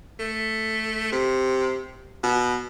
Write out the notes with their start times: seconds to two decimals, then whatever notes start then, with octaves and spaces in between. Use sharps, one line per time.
0.19 A3
1.12 C3
2.23 B2